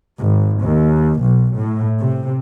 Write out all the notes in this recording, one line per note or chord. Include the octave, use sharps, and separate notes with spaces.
G#1
D#2
B1
A2
C3